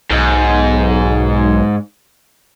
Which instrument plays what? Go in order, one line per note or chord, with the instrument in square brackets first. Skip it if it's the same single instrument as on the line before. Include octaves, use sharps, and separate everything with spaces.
[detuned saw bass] B1 [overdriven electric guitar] G#2